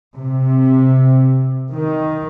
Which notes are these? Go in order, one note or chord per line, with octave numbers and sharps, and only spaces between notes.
C3
D#3